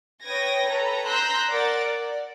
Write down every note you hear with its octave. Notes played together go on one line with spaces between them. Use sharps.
B4 C#5 G5 D#6 G#6 A#6
A4 B4 C#5 A#5
A#5 C6 E6 F#6 G6 A#6
A#4 D5 F#5 D6 A6
D5